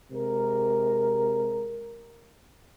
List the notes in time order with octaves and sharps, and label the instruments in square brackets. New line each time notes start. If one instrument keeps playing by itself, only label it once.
[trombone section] C3 G#3 A#4